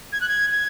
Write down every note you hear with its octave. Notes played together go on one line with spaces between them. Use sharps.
G#6
F#6
G#6
G#6